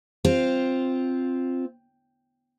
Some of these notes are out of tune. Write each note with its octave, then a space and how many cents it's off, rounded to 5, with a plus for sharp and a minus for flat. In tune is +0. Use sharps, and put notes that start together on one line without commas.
C4 +0 F4 +0